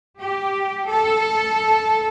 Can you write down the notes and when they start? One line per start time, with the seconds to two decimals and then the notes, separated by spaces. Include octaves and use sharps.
0.19 G4
0.88 A4